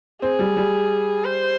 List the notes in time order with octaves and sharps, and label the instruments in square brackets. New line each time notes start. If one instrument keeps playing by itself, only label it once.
[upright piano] C4 [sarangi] G#4
[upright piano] G3
G3
[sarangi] C5